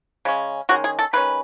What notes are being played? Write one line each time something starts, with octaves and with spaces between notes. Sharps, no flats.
C#3 G#3 C#4
D#3 G#3 C#4 F#4
G#4
A4
D#3 G#3 C#4 B4